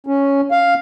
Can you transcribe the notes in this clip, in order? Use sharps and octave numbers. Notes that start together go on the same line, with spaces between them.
C#4
F5